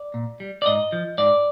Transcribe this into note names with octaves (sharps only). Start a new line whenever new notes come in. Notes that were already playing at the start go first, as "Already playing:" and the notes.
Already playing: D5
A#2
G3
D5
G#2 D#5
F3
G#2 D5